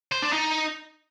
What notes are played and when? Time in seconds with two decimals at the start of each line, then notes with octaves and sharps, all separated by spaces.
0.12 C5
0.22 D4
0.33 D#4